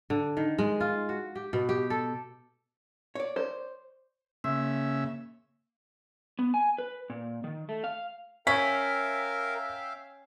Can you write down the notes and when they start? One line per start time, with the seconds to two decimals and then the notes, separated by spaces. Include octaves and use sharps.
0.10 D3
0.37 D#3
0.58 G#3
0.80 F4
1.09 F#4
1.35 G4
1.53 B2
1.69 G4
1.90 A4
3.15 C#5 D5
3.36 C5
4.44 C#3 A#3 E5
6.39 B3
6.54 G#5
6.78 B4
7.10 A#2
7.44 D#3
7.69 A3
7.84 F5
8.47 C#4 A#4 E5 F5 G5 B6